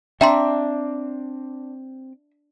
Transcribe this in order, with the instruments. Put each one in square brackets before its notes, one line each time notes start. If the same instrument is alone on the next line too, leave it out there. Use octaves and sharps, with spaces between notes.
[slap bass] C4 [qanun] D4 [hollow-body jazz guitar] E5 [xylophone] G5 A#5 C6